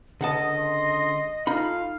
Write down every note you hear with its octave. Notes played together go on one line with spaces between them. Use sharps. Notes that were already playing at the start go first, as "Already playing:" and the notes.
C#2 D3 D#5 F#5 A5 D#6
C6
D#4 F4 A4 F5 B5